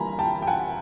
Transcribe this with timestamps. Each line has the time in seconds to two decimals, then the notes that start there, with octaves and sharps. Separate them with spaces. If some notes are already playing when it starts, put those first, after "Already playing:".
Already playing: E3 G3 A#3 G#5 A#5 B5
0.19 G5 A5
0.42 G5
0.47 F#5 G#5